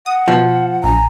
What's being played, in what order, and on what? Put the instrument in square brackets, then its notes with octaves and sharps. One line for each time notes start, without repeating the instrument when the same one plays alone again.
[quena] F#5 [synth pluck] D#6
[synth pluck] B2 [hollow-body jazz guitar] F3
[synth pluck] A#1 [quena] G#5 [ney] A#5